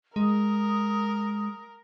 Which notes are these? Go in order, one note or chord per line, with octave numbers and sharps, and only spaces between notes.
G#3 A#4 D#6